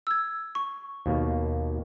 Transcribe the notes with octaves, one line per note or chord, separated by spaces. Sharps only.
E6 G#6
C#6
D#2 B2 A#3